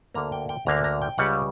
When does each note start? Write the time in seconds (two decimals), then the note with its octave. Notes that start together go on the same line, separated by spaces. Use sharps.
0.15 D2 D3 A#3 A#5
0.32 G5
0.49 G5
0.66 D2 D3 A#3 A#5
0.84 A#5
1.02 G5
1.18 C#2 C#3 G3 F#5